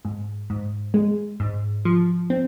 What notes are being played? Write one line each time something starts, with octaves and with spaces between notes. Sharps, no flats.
G#2
G#2
G#3
G#2
F3
C4